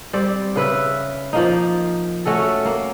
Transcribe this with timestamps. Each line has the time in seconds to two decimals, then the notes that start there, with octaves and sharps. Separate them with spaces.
0.13 G3 C4 D5
0.56 C#3 B4 E5
1.33 F3 A#3 D#4
2.25 A3 C#4 F#4 A4
2.65 A#3